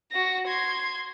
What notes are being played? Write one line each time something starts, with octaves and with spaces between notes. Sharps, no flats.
F#4 A#6
C6 G#6